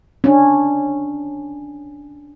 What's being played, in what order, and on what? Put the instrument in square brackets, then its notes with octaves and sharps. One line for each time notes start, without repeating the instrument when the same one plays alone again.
[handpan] C#4 D4